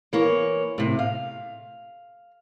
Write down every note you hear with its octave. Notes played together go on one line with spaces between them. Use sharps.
E3 A#3 C#5
A2 C3
F5